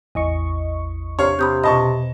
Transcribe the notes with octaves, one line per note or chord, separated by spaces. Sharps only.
A1 E2 D#5 C#6
C3 D4 C#5 F5
C3 B5 D#6 G6
B2 D#5 A5 B5 C#6